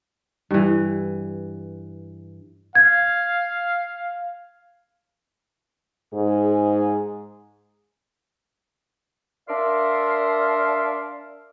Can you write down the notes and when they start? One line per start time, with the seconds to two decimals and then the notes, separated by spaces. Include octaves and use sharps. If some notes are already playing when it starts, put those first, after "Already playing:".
0.51 G2 E3
2.75 F5 G#6
6.13 G#2 G#4
9.49 D4 A#4 D5 E5 F5 C6